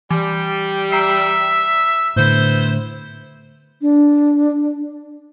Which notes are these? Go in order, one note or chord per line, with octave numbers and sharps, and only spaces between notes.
E3 G3
E5 A#5 C7
A2 D3 B3 E4 C5
D4